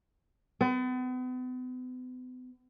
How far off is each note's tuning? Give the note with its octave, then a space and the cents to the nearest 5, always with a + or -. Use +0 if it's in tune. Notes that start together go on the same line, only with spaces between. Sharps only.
B3 +40